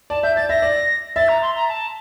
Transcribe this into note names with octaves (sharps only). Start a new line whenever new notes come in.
D5 A5
E5 G6
D5 A6
E5 A#6
D5
E5 A6
A#5
C6
A#5
A5